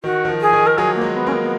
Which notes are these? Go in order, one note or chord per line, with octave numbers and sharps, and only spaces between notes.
D#3 F#4
D#3
F3
G#4
D#3
A#4
F#3 G#4
A#3
G#3
B3
A#3 C#4
B3
B3